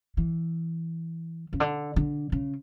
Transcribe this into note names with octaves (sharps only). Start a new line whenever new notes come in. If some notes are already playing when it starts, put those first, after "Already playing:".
E3
C#3
D3
D3
C#3